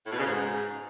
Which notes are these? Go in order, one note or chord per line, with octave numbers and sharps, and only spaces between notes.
A2
B2
C#3
G#2